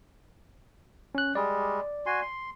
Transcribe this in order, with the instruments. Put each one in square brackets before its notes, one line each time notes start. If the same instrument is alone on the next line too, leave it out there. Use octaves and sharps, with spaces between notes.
[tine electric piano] C#4 F#6
[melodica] G3 G#3 [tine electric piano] D5
[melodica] F#4 G#5 C6
C6